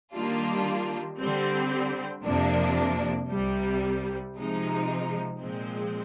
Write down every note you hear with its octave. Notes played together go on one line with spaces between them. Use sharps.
D#3 G3 A#3 D4 F4
D3 G3 C4
F2 C3 F3 A#3 D4
C2 C3 G3
C3 F3 G#3 D#4
A#2 F3 G#3 C4